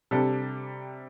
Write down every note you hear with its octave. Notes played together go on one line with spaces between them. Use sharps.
C3 G3 D4 A4